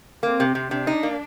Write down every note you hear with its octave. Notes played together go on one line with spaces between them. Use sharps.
A#3 C4
C3
C3
C3 D4
D#4
A#3